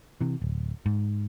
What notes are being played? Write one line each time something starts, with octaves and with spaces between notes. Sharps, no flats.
C3 E3
D1
G#2